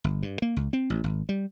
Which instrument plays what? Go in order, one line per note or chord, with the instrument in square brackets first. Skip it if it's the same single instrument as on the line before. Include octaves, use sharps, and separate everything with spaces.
[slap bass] G1
G2
A#3
C#2
C4
A1
G#1
G3